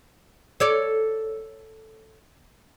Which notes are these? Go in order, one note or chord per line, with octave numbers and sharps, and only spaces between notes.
A4 C#5 D5